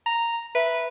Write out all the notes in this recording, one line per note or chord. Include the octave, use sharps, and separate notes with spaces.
A#5
B4 E5